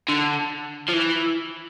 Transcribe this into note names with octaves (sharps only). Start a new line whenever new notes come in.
D3
F3
E3